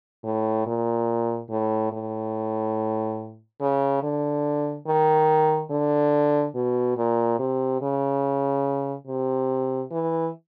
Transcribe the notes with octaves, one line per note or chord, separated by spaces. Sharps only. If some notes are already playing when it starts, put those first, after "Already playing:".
A2
A#2
A2
A2
C#3
D3
D#3
D3
B2
A#2
C3
C#3
C3
E3